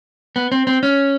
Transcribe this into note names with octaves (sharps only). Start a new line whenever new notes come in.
B3
C4
C4
C#4